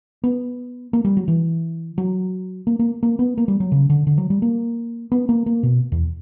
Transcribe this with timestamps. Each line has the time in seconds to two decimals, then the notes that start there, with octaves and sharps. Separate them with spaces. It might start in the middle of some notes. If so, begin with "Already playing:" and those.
0.24 B3
0.93 A#3
1.05 G3
1.17 F#3
1.28 E3
1.98 F#3
2.67 A#3
2.79 A#3
3.03 A#3
3.19 B3
3.38 A#3
3.48 G3
3.60 F#3
3.72 C#3
3.90 D3
4.07 D3
4.18 F#3
4.30 G3
4.42 A#3
5.12 B3
5.29 A#3
5.46 A#3
5.63 B2
5.92 E2